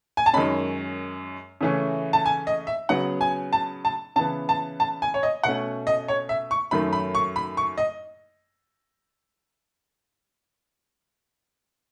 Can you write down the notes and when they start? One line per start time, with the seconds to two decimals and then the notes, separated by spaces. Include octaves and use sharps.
0.17 G#5
0.26 A5
0.33 F#2 D#3 G#3 C#4 B5
1.61 C#3 E3 A3 C#4
2.13 A5
2.26 G#5
2.47 D#5
2.67 E5
2.89 C#3 F#3 B3 F#5
3.21 G#5
3.53 A5
3.85 A5
4.16 C#3 E3 B3 A5
4.49 A5
4.80 A5
5.02 G#5
5.14 C#5
5.23 D#5
5.43 B2 A3 C#4 F#5
5.87 D#5
6.08 C#5
6.29 E5
6.51 C#6
6.71 F#2 D#3 F#3 A3 B5
6.93 B5
7.15 C#6
7.36 B5
7.57 C#6
7.78 D#5